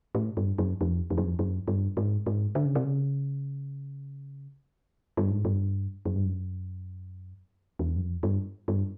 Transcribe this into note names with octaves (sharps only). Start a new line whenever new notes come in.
A2
G2
F#2
F2
F2
F#2
F2
F#2
G2
G#2
G#2
D3
C#3
C3
C#3
G2
G#2
G2
F#2
G2
F#2
E2
F#2
F2
G2
G2